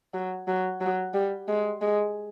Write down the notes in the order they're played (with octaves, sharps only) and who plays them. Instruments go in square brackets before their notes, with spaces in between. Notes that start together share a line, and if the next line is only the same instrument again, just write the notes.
[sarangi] F#3
F#3
F#3
G3
G#3
G#3